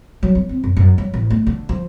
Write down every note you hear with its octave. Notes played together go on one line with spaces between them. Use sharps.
F#3
C#4
C4
F#2
F#2
F#3
A1
A3
D3
F3